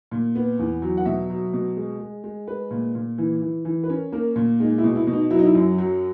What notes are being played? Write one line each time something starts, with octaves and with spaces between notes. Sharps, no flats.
A#2
B3
E2
F#3
F#5
B2 E5
F#3
B2
G#3
G#3
G#3
G#3 B4
A#2
A#2
E3
E3
E3
B4
C#4 A#4
A#3 A#4
A#2
G#3 D#4
E4
B2
E4
B2
D#4
F#3 E4
D#4
E4
F#2
F#3